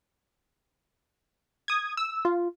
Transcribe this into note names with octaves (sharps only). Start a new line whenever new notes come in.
D#6 G#6
E6
F4